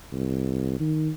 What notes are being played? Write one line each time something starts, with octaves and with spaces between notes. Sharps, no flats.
C2
D#3